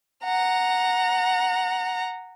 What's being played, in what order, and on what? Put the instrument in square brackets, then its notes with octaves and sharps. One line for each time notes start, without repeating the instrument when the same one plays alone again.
[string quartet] F#5 A#5